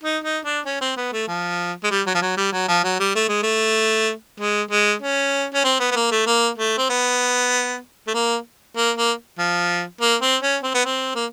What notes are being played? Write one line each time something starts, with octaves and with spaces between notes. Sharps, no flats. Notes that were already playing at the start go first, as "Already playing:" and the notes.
D#4
D#4
D4
C#4
C4
B3
A3
F3
G#3
G3
F#3
F3
F#3
G3
F#3
F3
F#3
G3
A3
G#3
A3
G#3
G#3
C#4
C#4
C4
B3
B3
A#3
A3
A#3
A3
C4
B3
A3
A#3
A#3
A#3
F3
A#3
C4
C#4
C4
B3
C4
A#3